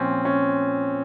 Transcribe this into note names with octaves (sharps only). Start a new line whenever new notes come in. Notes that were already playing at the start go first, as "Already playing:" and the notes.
Already playing: A#2 F3 C4 C#4
C#4